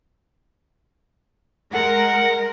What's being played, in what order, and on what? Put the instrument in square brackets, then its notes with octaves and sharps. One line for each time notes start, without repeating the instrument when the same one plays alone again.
[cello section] G#3 A#4 [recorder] F#5